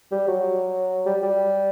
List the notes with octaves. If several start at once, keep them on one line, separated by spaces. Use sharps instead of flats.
G3
F#3
G3
G3